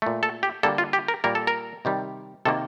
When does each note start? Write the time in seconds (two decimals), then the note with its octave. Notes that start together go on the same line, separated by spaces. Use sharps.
0.02 A#2 A3
0.23 A4
0.43 G4
0.63 D3 G3 A#3 A4
0.78 F4
0.93 G4
1.08 A#4
1.24 A#2 G3 A#3 A#4
1.35 A4
1.47 A#4
1.85 C3 D#3 G3
2.45 C3 D#3 A#3 A4